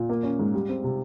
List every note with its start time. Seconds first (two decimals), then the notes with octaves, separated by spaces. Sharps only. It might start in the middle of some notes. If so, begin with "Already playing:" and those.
Already playing: A#2
0.09 A#3
0.23 C#4
0.39 G#2
0.54 G3
0.69 C4
0.84 C3